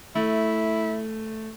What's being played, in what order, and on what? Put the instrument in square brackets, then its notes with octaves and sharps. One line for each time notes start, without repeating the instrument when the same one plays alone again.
[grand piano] A3 [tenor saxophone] E4